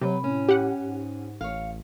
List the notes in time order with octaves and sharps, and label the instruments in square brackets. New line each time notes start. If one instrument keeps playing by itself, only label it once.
[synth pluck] C3 [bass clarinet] F#3 [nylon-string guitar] B4 G5
[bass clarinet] A2 [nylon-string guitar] C#4
[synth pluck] G4 F#5
[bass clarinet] G#2
[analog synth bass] A1 [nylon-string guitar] C#5 F5